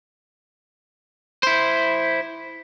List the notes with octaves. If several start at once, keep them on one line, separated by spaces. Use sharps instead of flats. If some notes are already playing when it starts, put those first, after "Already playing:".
E4 C5